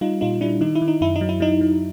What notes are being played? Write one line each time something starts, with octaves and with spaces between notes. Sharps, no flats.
G3 D#4 F4
A#2 D#4 F4
G3 D4 E4
D#3 D#4
E4
D#3
D#4
F#2 E4
D#4
F#3
E4
F#3 D#4
F#3